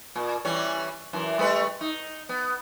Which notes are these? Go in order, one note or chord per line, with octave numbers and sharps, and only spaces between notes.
A#2
E3 G3 C#4
F#2 E3
G3 A3 B4
D#4
B3